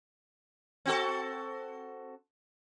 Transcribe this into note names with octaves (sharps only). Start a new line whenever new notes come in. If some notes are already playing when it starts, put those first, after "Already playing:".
C4 F#4 A4